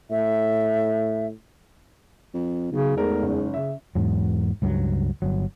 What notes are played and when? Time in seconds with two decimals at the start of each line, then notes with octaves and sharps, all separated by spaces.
0.11 A2 E5
2.34 F2
2.72 B1 C#3
2.96 E2 G#2 A3 A#4
3.22 F#1
3.54 C#3 E5
3.95 E2 G#2 F#3
4.62 C#2 G2 F#3
5.22 G1 F#3